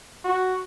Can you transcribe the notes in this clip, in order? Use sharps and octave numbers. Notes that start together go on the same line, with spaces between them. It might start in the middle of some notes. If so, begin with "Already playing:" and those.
F#4